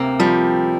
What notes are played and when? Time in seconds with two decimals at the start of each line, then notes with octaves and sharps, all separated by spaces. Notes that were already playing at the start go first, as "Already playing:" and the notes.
Already playing: D2 C3 A#3 C4
0.19 F3 G3